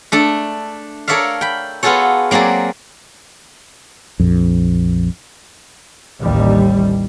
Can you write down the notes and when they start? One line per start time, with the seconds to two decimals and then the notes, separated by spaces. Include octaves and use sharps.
0.12 A3 D4 A4
1.08 A4 A#4 C#5 D5 E5 F5
1.41 G5 B5
1.83 B3 F4 F#4 G#4 A4 C#5
2.31 F#3 A#3 C4 G#4 D5
4.20 A#1 F2
6.22 A1 D#2 G3